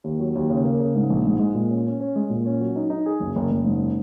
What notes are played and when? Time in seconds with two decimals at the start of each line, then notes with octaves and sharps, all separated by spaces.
0.04 D#2
0.19 F#3
0.35 D#2
0.50 C#3
0.64 A#3
0.79 C#3
0.95 G#2
1.10 A#1
1.26 G#2
1.39 G#3
1.54 A#2
1.70 C#4
1.85 C#4
2.00 C#4
2.16 G#3
2.30 A#2
2.45 C#4
2.60 F#3
2.76 D#4
2.90 D#4
3.06 G#4
3.20 F#1
3.36 F#1
3.51 F#1
3.65 G#2